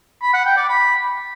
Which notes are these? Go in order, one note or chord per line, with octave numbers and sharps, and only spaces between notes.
B5
F#5
G5
D5
B5